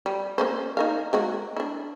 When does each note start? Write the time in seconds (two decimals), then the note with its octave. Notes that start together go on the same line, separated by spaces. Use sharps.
0.06 G3
0.38 A#3 C#4 C5
0.77 D#4 A#4 F5
1.13 G#3 A#3 F#4
1.57 D4 E4